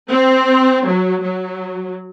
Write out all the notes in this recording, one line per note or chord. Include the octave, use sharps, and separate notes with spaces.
C4
F#3
F#3